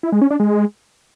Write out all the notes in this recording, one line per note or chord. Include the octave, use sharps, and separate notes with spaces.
E4
G#3
C#4
D4
G#3